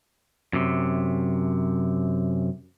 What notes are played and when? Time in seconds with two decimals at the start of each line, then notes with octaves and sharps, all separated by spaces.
0.53 F#2 C3